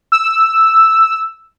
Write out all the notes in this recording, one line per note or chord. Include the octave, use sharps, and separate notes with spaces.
E6